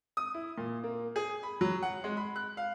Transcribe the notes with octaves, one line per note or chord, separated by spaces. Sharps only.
D#6
E4
A#2
A#3
G#4
B5
F#3
F#5
G#3
B5
F#6
F5